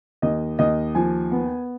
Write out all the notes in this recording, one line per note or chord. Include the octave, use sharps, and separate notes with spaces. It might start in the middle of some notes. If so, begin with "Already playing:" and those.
D#2 D#5
D#2 D#5
F3 G#5
B3